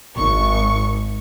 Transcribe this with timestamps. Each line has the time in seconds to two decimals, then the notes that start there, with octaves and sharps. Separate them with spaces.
0.15 G#1 C#6